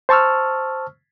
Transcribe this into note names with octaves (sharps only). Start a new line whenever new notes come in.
C5 A5 C#6 E6 F6